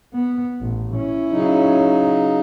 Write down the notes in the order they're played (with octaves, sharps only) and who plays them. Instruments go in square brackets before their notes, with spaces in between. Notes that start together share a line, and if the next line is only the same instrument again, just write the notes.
[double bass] B3
A1
C#4 E4
[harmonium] C#3 F#3 D#4